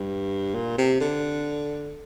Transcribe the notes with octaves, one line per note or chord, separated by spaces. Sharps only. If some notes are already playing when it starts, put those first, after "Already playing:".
Already playing: G2
A#2
C3
D3